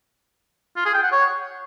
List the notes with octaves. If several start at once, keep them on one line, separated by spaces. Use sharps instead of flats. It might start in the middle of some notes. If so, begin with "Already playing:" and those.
F4
G#4
G5
F#5
C#5